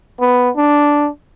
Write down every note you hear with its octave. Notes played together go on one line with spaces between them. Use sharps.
B3
D4